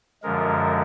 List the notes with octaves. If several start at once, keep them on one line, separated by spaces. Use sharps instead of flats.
F#2 D3 F3 G#3 A#4